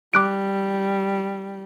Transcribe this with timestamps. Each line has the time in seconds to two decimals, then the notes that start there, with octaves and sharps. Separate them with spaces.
0.14 G3 D6 F#6 D7